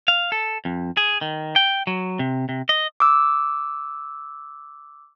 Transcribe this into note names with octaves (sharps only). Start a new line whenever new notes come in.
F5
A4
F2
G#4
D#3
G5
F#3
C3
C3
D#5
D6 E6